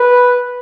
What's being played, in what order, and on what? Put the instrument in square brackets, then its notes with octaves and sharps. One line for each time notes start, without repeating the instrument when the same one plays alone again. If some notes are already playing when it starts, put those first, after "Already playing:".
Already playing: [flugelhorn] B4